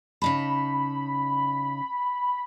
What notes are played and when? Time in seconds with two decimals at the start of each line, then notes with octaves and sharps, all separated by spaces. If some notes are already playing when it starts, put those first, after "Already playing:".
0.22 C#3 D#4 A5 B5